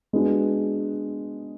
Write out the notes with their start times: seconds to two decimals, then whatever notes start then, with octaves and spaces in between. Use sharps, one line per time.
0.13 G#3 B3 D4 F#4 B4